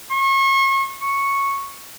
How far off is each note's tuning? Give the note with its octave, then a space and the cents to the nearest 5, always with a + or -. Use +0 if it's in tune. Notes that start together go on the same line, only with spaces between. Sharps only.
C#6 -35
C#6 -5